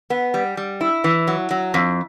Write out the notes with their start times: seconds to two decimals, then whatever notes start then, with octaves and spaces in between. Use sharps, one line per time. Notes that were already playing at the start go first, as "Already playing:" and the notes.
0.10 B3
0.34 G3
0.57 G3
0.81 E4
1.04 E3
1.27 F#3
1.51 F#3
1.74 F2